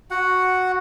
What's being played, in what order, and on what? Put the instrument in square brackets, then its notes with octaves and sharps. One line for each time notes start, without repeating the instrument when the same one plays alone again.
[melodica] F#4 F#5